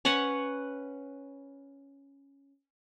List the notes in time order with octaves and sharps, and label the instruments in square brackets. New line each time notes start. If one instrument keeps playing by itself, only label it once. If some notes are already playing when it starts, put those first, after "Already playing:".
[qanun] C#4 B4 C#5 F#5